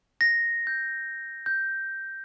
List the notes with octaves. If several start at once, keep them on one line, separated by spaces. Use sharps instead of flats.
A#6
G6
G6